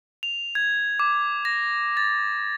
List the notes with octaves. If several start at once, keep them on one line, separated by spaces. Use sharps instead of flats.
F7
G#6
D6
A#6
A6